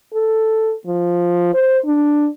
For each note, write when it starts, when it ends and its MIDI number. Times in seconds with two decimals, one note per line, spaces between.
0.14 0.73 69
0.87 1.54 53
1.54 1.78 72
1.86 2.28 62